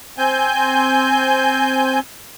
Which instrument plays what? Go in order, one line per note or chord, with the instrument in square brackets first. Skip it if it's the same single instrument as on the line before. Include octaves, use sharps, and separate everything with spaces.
[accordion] C4 G#5 G6